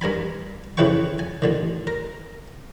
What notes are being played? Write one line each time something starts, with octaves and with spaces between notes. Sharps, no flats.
G2 A#4 G#5 B5
F2 C#3 E4 B4 G5 C#6
G#5
A1 D3 D#3
A#4